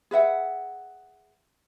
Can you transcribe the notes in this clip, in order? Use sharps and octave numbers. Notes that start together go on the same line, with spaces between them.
G#4 B4 E5 F#5